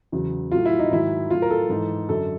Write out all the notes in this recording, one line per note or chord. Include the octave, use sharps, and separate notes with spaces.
E2 C#3 F#3
A2 F#3 F4
E4
D#4
G#2 D#3 F#3 E4
A2 F#3 F4
A#4
A4
G#2 E3
F#2 D3 F#3 A4